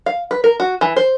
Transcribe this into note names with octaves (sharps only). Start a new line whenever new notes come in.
F5
B4
A#4
F#4
E3
C5